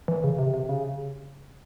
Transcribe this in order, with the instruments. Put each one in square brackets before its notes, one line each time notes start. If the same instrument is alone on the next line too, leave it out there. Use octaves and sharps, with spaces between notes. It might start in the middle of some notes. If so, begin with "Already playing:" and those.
[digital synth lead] E3
C#3
C3
C3
C#3